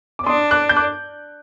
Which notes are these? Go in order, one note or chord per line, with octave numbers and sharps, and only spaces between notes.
D6
D4 C6 D#6
D6 F#6
G6
D6 F#6